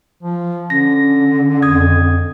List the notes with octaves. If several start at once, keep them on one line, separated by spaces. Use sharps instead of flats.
F3
D3 C#4 A#6
F2 D#6 G#6